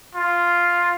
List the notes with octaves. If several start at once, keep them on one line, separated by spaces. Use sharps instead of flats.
F4